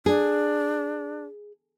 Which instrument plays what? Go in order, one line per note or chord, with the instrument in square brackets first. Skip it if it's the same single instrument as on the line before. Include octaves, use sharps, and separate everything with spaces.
[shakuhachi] D4 [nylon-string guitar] G#4